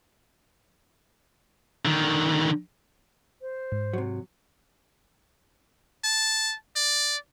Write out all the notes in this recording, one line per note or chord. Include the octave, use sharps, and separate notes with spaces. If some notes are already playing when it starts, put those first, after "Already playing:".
D3 D#3
C5
G#2
C3 F#3
A5
D5